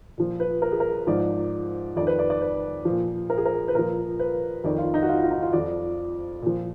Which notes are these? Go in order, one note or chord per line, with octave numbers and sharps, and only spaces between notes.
A#2 F3
B4
A#4
G#4
A#4
G#2 F3 D5
F2 D#3 D5
B4
D5
D5
B4
A#2 F3
A#4
G#4
A#4
B4
A#2 F3 A#4
B4
F2 D#3 D5
F4
D#4
F#4
F4
F4
D#4
F4
F2 F3 D5
A#2 F3